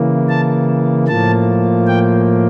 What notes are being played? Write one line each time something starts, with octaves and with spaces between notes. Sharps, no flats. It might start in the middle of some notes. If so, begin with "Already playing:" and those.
Already playing: C#3 E3 A#3
A5
A2 F3 A#3 A5
G5